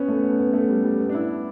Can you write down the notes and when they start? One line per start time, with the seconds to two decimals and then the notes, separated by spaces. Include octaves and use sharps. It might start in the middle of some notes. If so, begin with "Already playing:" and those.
Already playing: B3 C#4
0.08 A3
0.23 B3
0.39 B3
0.53 A3
0.69 G3
0.84 G3
0.99 B3
1.09 D4
1.14 E4